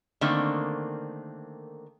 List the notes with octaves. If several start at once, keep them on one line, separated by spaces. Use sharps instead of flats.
D3 D#3 A3 A#3 C4